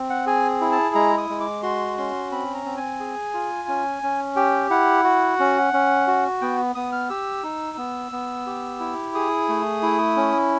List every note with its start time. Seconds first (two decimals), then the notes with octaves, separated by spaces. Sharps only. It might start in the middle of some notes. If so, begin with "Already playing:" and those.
Already playing: C4
0.10 F#5
0.26 G#4 G#5
0.61 E4
0.72 A5
0.95 G#3 A#5
1.18 D#6
1.30 G#3
1.41 D6
1.63 F#4 C6
1.98 C#4 C6
2.31 C4 B5
2.54 A#5
2.66 C4
2.77 G#5
3.00 G#4
3.34 F4
3.68 C#4
4.03 C#4
4.36 G4 G5
4.70 E4 F#5
5.04 F#4
5.40 C#4
5.73 C#4
6.07 F#4
6.41 B3 G5
6.75 B3 D#6
6.92 F6
7.09 G4 E6
7.43 D#4
7.77 B3
8.12 B3
8.46 G4
8.80 E4
9.15 G#4 D#6
9.49 A3
9.83 E4
10.16 C#4